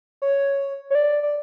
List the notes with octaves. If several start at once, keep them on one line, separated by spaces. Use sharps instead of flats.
C#5
C#5
D5
D5